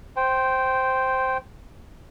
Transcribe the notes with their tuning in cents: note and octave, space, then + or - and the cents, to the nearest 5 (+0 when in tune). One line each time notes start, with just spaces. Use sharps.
C5 +0 G5 -10